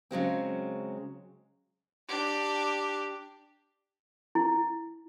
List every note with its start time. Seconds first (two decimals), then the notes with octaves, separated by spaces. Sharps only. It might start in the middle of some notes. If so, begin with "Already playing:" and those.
0.11 C#3 F#3 G#3 C4
2.08 D4 G4
4.35 E4